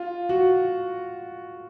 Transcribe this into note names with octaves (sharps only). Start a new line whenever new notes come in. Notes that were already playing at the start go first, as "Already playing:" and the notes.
Already playing: F4
F#4